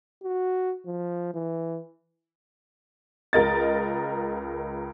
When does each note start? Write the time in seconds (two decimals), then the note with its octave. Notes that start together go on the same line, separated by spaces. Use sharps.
0.24 F#4
0.86 F3
1.34 E3
3.33 C#2 A#4 D#5 A6